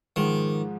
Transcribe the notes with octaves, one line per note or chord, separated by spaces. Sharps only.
G#2 D#3 F3 G#3